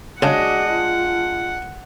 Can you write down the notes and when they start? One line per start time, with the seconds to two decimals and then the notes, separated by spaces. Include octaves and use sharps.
0.22 C#3 G#3 D4 F#4 D#5 F#5
0.72 F4